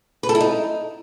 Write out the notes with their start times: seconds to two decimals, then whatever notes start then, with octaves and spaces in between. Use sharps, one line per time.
0.23 B4
0.29 A4
0.35 E4
0.41 D#4